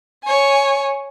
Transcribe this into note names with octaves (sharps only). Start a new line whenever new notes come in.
C#5 G#5